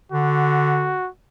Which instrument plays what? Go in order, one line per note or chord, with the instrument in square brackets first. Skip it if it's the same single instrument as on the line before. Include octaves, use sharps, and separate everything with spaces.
[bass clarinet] D3 [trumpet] F#4